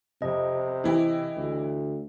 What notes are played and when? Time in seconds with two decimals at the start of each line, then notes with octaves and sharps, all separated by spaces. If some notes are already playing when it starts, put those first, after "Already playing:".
0.22 F2 C3 D#5
0.84 E3 E4 G4
1.37 D2